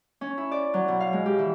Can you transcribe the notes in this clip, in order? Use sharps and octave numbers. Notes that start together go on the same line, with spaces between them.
C#4
E4
D5
F#3
B2
F5
G#3
G4
E3